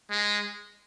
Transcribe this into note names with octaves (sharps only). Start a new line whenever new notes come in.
G#3